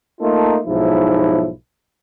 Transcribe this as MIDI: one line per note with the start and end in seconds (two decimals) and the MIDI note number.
0.21 0.58 57
0.21 0.58 58
0.21 0.58 63
0.21 0.58 65
0.21 0.58 69
0.67 1.49 35
0.67 1.49 44
0.67 1.49 53
0.67 1.49 64